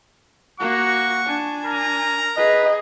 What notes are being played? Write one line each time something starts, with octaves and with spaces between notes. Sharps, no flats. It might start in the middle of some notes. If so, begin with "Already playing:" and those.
A#3 F#4 F#5 C#6
D4 G#5
A#4 A#5
G#4 B4 D#5